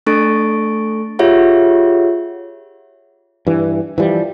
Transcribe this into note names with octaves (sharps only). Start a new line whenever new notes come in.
A3 D4 A4 C#6 A6 D7
F4 G4 G#4 C#5 E5 F#5
G2 E3
E3 F3 G3